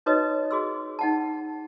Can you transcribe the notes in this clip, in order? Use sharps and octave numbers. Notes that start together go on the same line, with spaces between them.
D#4 F#4 B4 C#5 D#5 D#6
F#4 G#4 C6 E6
D#4 F#5 A5